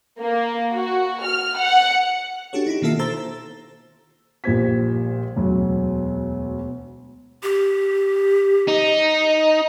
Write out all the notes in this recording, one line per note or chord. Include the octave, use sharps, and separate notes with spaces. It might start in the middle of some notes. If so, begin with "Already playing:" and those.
A#3
F#4
F6
F#5
D4 F#4 G4 A4 C#5
D#4 E4 G4
B2 D#3 A#3 F4 A4 E5
A4 C5 A5 A#5 E6 A6
A#1 A#2 G3 C5 G#6 B6
E1 D2 F#3
G4
D#4